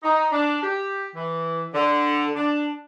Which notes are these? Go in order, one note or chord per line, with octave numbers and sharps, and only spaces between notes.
D#4
D4
G4
E3
D3
D4